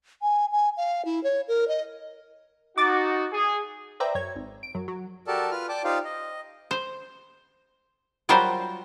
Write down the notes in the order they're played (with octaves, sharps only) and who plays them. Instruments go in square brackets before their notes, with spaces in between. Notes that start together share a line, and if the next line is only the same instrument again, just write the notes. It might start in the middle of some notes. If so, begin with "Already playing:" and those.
[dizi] G#5
G#5
F5
E4
C#5
A#4
D#5
[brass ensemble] D#4 F#4 [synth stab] D6 A6
[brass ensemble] G#4
[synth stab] B4 C5 D5 E5 G5 A#5
F#2 C#5 G#6
G#1
D7
F#2 F#3
F#3
[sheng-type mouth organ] F#4 G4 A4 A#4 D5 A5
F4 B4 F6
D5 G5 A5 D6
D#4 F4 G4 C5 D5 F5
D#5
[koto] C5
F#3 G3 F4 F#4 A#4 C5